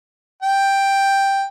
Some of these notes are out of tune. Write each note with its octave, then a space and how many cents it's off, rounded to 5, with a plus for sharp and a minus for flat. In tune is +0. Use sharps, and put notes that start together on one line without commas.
G5 +5